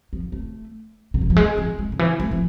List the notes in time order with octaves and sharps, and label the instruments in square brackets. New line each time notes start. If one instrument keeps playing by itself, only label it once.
[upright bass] F3
A3
D3
E3
F3
G#3
F3
G#3
D3
E3
A3
F3